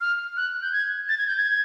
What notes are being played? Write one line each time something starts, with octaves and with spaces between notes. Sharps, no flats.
F6
F#6
G6
G#6
A6
G#6
G6
G#6